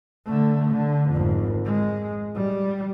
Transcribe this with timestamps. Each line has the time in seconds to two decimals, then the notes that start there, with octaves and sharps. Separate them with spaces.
0.25 D3 A3
0.69 D3
1.10 G#1 F2
1.65 G#3
2.35 G3